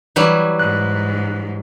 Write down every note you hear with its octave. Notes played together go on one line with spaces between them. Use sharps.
E3 F#3 G3
G#2 F#6